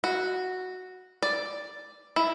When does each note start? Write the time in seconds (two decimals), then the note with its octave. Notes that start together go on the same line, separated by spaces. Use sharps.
0.04 F#4
1.22 D5
2.16 E4